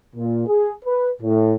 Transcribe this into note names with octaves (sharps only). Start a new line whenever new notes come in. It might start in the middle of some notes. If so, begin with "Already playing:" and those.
A#2
G#4
B4
A2